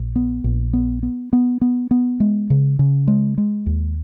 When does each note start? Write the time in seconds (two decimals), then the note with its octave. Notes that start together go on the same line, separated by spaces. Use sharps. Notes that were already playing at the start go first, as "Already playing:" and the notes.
Already playing: A#1
0.16 B3
0.44 A#1
0.73 B3
1.03 B3
1.33 B3
1.61 B3
1.91 B3
2.20 G#3
2.50 C#3
2.79 C#3
3.08 G#3
3.38 G#3
3.66 D#2